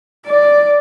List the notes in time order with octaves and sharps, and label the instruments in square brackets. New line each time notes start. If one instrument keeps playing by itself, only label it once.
[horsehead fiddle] D5